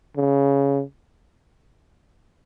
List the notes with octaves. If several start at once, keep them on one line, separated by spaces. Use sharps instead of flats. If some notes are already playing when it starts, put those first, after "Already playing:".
C#3